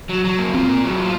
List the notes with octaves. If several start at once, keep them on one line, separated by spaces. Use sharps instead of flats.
F#3
F#3
A#3
C4 F4
A#3
F#3
F4